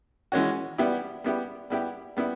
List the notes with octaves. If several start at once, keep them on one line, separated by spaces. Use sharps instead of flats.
E3 G#3 C#4 F#4
G3 B3 E4 G4
G3 B3 E4 G4
G3 B3 E4 G4
G3 B3 E4